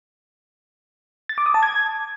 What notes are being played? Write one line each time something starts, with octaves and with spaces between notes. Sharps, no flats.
A6
D6
D#6
A5
G#6